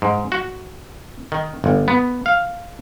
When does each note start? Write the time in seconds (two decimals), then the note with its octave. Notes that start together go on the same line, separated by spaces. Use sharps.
0.02 G#2
0.32 F#4
1.32 D#3
1.64 G1
1.88 B3
2.26 F5